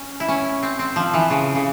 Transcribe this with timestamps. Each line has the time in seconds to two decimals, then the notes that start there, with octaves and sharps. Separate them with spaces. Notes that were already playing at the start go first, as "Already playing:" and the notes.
Already playing: C#4
0.20 E4
0.28 C#4
0.63 C4
0.79 C4
0.96 F3
1.14 E3
1.30 C#3
1.55 C#3